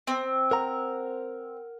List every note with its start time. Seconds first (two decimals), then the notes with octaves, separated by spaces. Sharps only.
0.07 C4
0.51 A#4 F#5 A#5